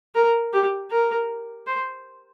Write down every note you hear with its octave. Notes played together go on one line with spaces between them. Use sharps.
A#4
G4
A#4
C5